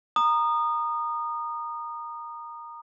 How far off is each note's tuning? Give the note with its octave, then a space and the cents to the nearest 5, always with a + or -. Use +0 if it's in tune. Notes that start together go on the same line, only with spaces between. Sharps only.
A#5 +0 D#6 -25